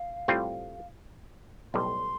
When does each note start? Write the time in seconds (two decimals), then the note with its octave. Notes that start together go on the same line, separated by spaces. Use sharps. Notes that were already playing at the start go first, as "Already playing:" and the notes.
Already playing: F5
0.28 A2 G3 C4 F4
1.74 B1 A2 G3 C6